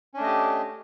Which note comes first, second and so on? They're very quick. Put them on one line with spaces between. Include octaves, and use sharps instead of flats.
C#4 D4 A3 D#5 G4